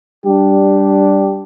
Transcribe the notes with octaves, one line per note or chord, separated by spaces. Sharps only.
G3 D4 G4